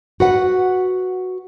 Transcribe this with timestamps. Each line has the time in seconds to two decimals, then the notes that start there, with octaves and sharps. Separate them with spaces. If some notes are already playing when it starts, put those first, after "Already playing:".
0.20 F#4 B4 F#5